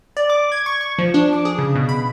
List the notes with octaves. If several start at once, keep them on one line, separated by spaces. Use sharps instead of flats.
D5
D6
G#6
C#6
C#6
F3
D4
D6
G#4
C#3
B2
B5